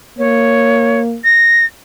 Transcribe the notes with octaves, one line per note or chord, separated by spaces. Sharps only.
A#3 C#5
A#6